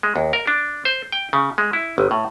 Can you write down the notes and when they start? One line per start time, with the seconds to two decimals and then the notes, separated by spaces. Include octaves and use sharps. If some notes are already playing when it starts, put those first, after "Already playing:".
0.03 G#3
0.16 D#2
0.33 A#4
0.47 D4
0.85 C5
1.12 G5
1.33 C#3
1.58 G#3
1.73 E4
1.98 G1
2.11 A2